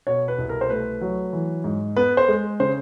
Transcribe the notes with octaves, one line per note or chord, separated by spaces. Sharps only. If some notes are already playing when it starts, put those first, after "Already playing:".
B2 C#5
B4
C2
A#4
C5
A3 B4
F#3
E3
G#2
B3 B4
C5
G#3
C#3 C5